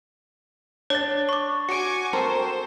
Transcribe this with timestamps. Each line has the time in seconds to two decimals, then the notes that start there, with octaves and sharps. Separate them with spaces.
0.90 D4 C#5 A6 G7
1.29 C#6 D6
1.69 F#4 G#5 C#6 D6 C#7 D7
2.13 C4 A4 A#4 C5